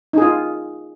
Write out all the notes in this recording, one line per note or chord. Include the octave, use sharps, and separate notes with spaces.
D#4 F4 G#4